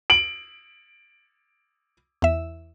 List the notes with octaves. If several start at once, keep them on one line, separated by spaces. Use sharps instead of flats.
D7 F#7
E2 E5